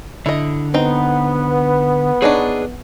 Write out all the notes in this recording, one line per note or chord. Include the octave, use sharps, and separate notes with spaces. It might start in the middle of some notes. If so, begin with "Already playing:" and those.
D3 E4 D#5
B3 C4 D#4
D4 D#4 G#4 B4 C#5